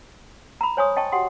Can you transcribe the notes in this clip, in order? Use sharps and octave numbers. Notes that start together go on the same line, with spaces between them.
A#5 B5
C5 C#5 G#5 C6 C#6 D#6
D#5 G5 A5 C#6
F#4 G4 F#5 G5 C6 D#6